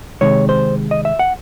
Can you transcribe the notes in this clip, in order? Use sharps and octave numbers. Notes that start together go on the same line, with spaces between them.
C3 D#3 G#3 C#5
C5
D#5
E5
F#5